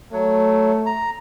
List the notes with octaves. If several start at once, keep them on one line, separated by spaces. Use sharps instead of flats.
F#3 A3
A#5